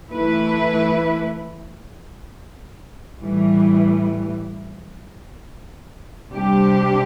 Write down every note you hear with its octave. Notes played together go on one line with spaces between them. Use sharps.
E3 A3 E4 B4
A2 E3 G3
C3 G3 D4 G4